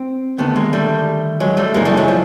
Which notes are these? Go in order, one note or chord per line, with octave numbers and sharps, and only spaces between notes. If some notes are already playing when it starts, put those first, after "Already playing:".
Already playing: C4
D#2 D3 A3 B3
G#3 A#3
G3 A3
F#3 G#3
G3 A3
F#2 C#3 E3 G#3 A#3
G3 A3
F#3 G#3
F3